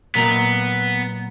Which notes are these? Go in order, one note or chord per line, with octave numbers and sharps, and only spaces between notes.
A#2 F#3 B3 A#4